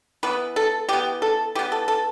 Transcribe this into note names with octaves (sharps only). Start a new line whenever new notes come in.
E3 B3 B4
A4
E3 B3 G4
A4
E3 B3 G4
A4
A4